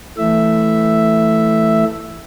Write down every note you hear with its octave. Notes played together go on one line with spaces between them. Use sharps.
E3 A3 E5